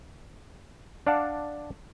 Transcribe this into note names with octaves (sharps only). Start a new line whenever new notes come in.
D4 D5 F5 F#5 A5